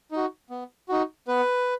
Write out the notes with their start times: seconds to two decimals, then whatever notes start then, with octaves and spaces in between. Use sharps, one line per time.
0.11 D#4 F#4
0.50 B3
0.89 D#4 F#4
1.28 B3 B4